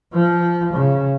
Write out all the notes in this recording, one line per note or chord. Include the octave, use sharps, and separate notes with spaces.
F3
C#3